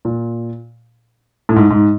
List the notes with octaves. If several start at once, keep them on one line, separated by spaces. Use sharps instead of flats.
A#2
A2
G#2
G#2